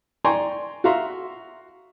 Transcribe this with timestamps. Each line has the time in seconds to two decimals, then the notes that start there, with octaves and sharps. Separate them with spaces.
0.24 D5 G5 G#5 A#5 C6 C#6
0.84 F#4 E5 F5 A#5 C6